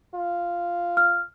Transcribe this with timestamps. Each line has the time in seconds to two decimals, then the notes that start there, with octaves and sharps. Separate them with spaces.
0.15 F4
0.97 F6